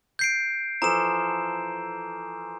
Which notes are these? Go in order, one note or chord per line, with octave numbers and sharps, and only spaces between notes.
G6 C7 D7
E3 F3 A4 A#5 E7